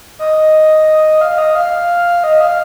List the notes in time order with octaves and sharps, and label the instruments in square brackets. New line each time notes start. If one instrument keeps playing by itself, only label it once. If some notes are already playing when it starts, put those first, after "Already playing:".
[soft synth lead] D#5
F5
D#5
F5
D#5
F5